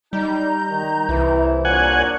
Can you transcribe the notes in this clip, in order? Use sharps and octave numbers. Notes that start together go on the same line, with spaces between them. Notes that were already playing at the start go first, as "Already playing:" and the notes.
G3 D#4 A#5 G6
D#3
C2 E3
A#2 D4 A#4 C#5 F#5 G#5